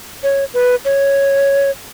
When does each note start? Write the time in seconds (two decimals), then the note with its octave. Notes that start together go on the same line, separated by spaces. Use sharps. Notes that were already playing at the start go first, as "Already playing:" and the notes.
0.23 C#5
0.54 B4
0.85 C#5